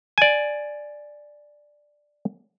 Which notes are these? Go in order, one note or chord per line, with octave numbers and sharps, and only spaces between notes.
D5 G#5